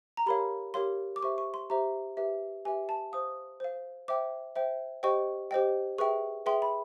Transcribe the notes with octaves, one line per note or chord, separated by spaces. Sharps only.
A#5
G4 A#4 C#5 F5 B5
G4 A#4 C#5 F5 C6
D6
G4 C5 E5 C#6
C#6
C6
G4 C5 E5 A#5
G4 B4 E5
G4 B4 E5 G#5
A5
C5 F5 D#6
C5 F5
C5 E5 G5 D6
C5 E5 G5
G4 C5 D#5 G5 C#6
G4 C5 D#5 G5
G#4 B4 E5 G5 C#6
G#4 B4 E5 G5 C6
B5